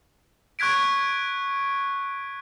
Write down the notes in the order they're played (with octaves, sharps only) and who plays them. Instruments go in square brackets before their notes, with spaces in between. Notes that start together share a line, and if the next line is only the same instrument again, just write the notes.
[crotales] C#6 F#6 G#6 B6 D7